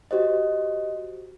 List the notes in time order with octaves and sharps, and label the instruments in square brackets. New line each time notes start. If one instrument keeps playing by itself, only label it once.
[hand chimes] F#4 G4 C5 D#5